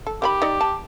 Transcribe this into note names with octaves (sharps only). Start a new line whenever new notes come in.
A4
D#3 F4 G4 B5
D#4 D5
A5